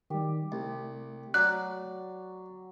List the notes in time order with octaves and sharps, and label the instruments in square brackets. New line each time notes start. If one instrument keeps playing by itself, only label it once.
[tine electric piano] D#3 G3 [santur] G4
[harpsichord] C2 [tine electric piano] A3
[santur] F#3 [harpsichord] D5 [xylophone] F#6